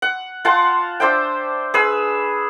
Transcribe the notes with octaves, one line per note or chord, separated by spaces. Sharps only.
F#5
F4 F#5 A5 C6
D4 C5 E5 G5
G#4 B4 E6